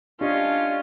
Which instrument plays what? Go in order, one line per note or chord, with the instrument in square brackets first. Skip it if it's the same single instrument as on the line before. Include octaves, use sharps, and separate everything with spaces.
[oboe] C#4 [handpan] D4 G4 D#5 [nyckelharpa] F4